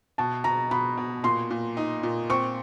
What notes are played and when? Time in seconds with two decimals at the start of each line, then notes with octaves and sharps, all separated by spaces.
0.18 B2 A5
0.44 B2 A#5
0.71 B2 B5
0.97 B2
1.24 A#2 C6
1.50 A#2
1.77 D#4
2.03 A#2
2.30 C4 C#6